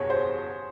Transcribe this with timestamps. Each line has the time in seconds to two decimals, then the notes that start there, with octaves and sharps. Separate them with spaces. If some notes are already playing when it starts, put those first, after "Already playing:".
Already playing: F#1 E2 B2 G#4 C#5
0.10 C5